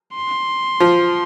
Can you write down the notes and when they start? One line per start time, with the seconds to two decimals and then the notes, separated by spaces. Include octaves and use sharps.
0.15 C6
0.80 F3